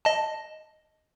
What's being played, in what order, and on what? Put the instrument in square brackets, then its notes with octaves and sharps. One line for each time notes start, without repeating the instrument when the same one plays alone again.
[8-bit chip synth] D#5 A5